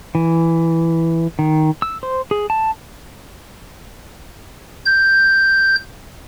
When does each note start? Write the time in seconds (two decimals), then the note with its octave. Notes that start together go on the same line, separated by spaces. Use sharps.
0.15 E3
1.39 D#3
1.82 E6
2.03 C5
2.31 G#4
2.50 A5
4.85 G6